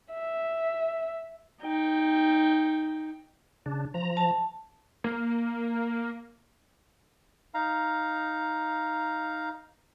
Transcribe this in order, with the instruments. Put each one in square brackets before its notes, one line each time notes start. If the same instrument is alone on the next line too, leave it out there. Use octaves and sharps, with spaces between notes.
[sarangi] E5
[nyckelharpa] D#4 G5
[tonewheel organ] C#3 D4
F3 A#5
[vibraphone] A5
[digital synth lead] A#3
[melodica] D#4 F5 A#5